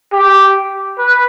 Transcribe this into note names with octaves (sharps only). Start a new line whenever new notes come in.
G4
B4